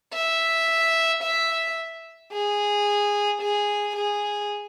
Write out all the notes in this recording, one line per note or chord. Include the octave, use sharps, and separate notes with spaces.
E5
E5
G#4
G#4
G#4